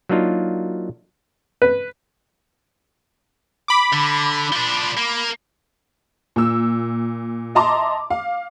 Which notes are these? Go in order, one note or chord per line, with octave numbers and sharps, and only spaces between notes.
F#3 A#3 D4 D#4 F4
B4
B5 D6
D3
F3 D4
A#3
A#2 E6
D#5 E5 A5 A#5 C6 D6
F5